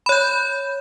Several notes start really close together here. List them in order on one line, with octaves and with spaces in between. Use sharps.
B5 C#5 G6